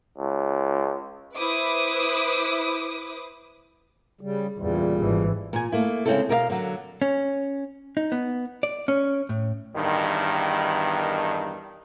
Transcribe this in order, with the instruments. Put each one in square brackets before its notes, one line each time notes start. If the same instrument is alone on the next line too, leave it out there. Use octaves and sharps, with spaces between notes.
[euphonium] C#2
[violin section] E4 B4 C5 D6 D#6
[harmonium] C#3 G3
[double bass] E2 [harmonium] A#2 C#3 G3
[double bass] G#1 E3
[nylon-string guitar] A#2 G#5
A3 A#3 E4
C#3 G#3 C4 C#4 E4 A4
B2 A#4 D#5 F5
D3 F#3
[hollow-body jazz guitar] C#4
D#4
B3
D5
C#4
A2
[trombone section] E2 G2 D#3